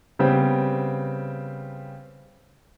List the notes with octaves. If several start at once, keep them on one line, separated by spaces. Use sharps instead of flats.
C#3 G3 B3 C4